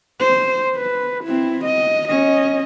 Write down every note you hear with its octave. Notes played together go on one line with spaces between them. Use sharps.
C5
B4
C4 E4
D#5
C#4 D#5